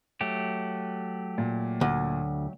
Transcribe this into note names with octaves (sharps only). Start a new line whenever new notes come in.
F#3 A3 G4
A#2
D2